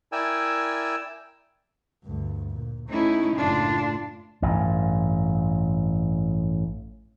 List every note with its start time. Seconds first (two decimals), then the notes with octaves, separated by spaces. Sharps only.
0.12 E4 A#4 D5 G5 G#5 E6
2.04 D2 G2
2.52 A#2
2.90 A3 C#4 D#4 E4
3.39 F#1 A2 D4 F4
4.42 A1 G2